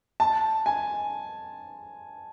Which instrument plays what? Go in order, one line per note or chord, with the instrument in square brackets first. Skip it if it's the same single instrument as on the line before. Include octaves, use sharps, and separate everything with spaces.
[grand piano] A5
G#5